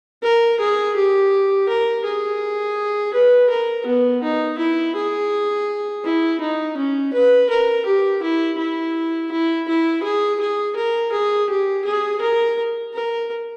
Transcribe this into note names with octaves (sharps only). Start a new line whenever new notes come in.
A#4
G#4
G4
A#4
G#4
B4
A#4
B3
D#4
E4
G#4
E4
D#4
C#4
B4
A#4
G4
E4
E4
E4
E4
G#4
G#4
A#4
G#4
G4
G#4
A#4
A#4